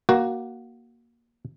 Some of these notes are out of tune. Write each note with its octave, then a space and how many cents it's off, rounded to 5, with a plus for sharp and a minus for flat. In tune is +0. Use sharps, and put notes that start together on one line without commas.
A#3 +10 F#4 +10